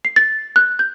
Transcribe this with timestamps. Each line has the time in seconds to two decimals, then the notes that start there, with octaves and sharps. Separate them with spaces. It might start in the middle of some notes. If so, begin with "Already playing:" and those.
0.05 C7
0.16 A6
0.56 F#6
0.79 G6